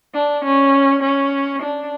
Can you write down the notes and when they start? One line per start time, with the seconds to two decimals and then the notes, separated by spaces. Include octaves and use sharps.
0.14 D4
0.44 C#4
1.03 C#4
1.62 D4